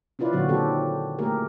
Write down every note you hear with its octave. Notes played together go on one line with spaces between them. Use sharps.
C#4 E4 F4 B4 D5
A#2 D3 F#3 C4 F#4
D#3 C4 G4 A4
A3 A#3 G4 G#4 A#4